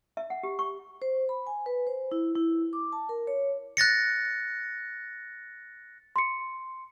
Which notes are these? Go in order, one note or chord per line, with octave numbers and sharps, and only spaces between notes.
E5
F#5
G4
C#6
C5
B5
G#5
B4
C5
E4
E4
D6
A5
A#4
C#5
F#6 A6 A#6 C#7
C6 C#7